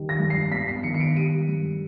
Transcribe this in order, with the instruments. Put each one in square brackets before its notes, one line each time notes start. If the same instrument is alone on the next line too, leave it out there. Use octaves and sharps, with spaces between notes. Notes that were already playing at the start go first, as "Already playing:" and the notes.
Already playing: [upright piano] D#3 G3
A#6
G2
C7
B3 B6
C7
D#3 C#7
C#7
D7
G3 D#7
G2